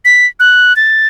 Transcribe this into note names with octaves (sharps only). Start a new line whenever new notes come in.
B6
F#6
A6